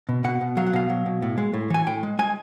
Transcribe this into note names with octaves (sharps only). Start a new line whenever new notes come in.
B2
B2 F#5
B2
F#3 F5
F#5
B2 F5
F#3
B2
A2
G#3
A2
E3 G#5
A2 G5
G#3
G#3 G#5